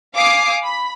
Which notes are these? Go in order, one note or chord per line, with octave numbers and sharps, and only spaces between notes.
F5 G#5 D6 D#6 C7
B5